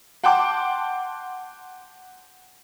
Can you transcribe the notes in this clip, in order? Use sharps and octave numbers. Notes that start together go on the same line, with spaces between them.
F#5 G5 A5 C6 D6